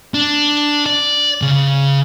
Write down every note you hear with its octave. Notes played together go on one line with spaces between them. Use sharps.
D4
D5
C#3